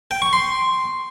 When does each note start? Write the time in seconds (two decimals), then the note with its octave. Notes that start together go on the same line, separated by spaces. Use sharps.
0.11 G5
0.22 C#6
0.33 C6